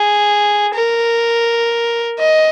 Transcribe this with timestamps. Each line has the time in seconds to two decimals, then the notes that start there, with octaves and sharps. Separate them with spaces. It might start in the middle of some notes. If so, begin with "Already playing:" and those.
Already playing: G#4
0.75 A#4
2.19 D#5